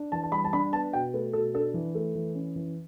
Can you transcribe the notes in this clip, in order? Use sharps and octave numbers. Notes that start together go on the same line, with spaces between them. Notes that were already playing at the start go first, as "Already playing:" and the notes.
Already playing: D4
E3 A5
A5
G3 B5
A5
D4 B5
B3 A5
B2 G5
A3 B4
B2 A4
D4 A4
E3
A3
E3
C#4
E3